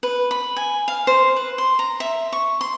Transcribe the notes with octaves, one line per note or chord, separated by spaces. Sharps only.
B4
B5
G#5
F5
C5
B4
C6
A#5
E5
C#6
C6